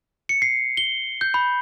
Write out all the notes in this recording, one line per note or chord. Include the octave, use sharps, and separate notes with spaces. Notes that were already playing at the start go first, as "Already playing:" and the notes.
C#7
C7
G7
G6
B5